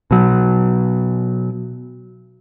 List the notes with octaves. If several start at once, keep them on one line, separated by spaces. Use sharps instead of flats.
B2 F#3